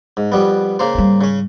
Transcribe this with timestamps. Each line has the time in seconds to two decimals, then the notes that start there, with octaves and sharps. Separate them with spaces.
0.17 G#2
0.32 F2 G3 B3
0.79 C#3 A#3 C5
0.94 G#2 G3
1.21 C#3 C#4